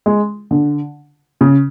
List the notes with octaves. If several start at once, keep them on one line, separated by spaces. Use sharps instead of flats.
G#3
D3
C#3